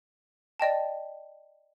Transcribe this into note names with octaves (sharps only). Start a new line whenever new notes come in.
D5 D#5 G5 A5